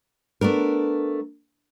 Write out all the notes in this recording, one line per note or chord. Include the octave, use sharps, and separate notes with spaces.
A3 B3 D4 A#4